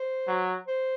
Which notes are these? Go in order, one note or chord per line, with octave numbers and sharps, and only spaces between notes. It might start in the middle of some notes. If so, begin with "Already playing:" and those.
Already playing: C5
F#3
C5